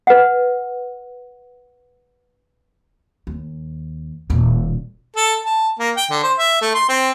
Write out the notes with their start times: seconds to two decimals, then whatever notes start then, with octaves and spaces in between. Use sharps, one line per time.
0.07 B4 F#5
3.27 D#2
4.30 D#1 A#2
5.16 A4
5.46 A5
5.79 A#3
5.97 G5
6.11 D3
6.23 C5
6.38 E5
6.62 A3
6.74 C6
6.89 C4